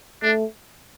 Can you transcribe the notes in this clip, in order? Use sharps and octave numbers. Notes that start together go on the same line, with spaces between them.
A3 D4